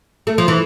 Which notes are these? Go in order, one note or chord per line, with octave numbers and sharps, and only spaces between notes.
A3
F3
E3